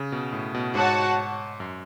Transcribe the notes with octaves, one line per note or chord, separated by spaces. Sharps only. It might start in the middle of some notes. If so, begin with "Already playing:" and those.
Already playing: C#3
B2
A2
B2
G#2 F#4 C#5 F#5 A5
F#2